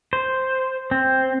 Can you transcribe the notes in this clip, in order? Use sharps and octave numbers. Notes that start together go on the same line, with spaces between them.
C5
C4